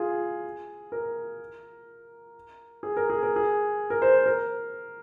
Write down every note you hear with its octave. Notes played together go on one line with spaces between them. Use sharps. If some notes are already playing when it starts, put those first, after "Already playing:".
Already playing: F4 G#4
A#4
G#4
A#4
G#4
A#4
G#4
A#4
C5
A#4